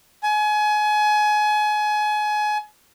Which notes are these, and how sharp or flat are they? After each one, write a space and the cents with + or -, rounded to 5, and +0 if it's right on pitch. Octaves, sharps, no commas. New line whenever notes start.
G#5 +30